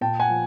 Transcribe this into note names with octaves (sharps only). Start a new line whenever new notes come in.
A#2 G5 A5
F#5 G#5
F3